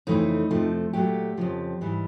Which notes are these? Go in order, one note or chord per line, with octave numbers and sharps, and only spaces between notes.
F2 C#3 E3 A3 D#4
F2 C3 F3 A3
A#2 F#3 A3 G4
F2 C#3 F3
G#2 E3 G3